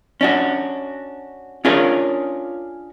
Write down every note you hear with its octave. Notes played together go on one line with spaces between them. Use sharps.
C#4 D4 F#4
C#4 D4 F4 G#4 A#4 C#5